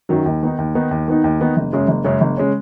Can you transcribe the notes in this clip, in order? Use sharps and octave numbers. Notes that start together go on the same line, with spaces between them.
F#2 D#3 F#3
D#2
D#3 B3 D#4
D#2
D#3 B3 D#4
D#2
D#3 B3 D#4
D#2
D#3 B3 D#4
F#1
F#2 C#3 G#3 C#4
F#1
F#2 C#3 G#3 C#4
F#1
C#3 G#3 C#4